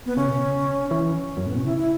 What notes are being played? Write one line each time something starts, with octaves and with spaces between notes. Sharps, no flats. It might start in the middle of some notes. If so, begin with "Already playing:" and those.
B3
C#3 C#4
B2
C#3
E3 C#4
F#2
A2 B3
B2 C#4
C#3 E4
E4